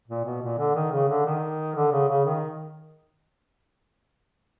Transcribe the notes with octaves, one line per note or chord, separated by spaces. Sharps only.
A#2
B2
A#2
D3
D#3
C#3
D3
D#3
D3
C#3
C#3
D#3